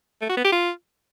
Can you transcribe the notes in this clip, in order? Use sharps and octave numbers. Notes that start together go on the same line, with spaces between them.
A3
F#4
B3
G4
F4